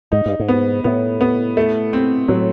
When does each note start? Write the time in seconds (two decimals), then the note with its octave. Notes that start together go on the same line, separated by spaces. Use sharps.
0.12 G#2 D#4
0.26 G2
0.40 G#2
0.48 B3
0.84 A2 B3
1.21 B3
1.57 A3
1.93 C4
2.28 A2 F#3